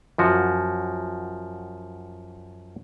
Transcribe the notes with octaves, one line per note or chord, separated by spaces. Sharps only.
F#2 F3 F#4